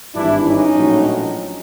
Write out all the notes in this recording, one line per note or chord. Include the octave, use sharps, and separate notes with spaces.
G#1 G2 E3 D4 E4
C#4 D#4
A#1 A2 F#3